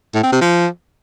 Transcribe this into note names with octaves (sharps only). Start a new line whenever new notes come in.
A2
C4
C3
F3